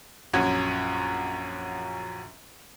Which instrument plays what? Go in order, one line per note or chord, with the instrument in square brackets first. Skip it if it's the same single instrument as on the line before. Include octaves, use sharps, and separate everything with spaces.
[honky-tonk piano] A#1 F#2 C#4 F#4 G#6